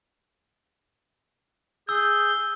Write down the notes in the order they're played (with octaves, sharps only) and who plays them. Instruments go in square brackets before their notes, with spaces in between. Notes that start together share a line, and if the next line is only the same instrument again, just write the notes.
[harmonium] G#4 [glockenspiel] E6 [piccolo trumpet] G6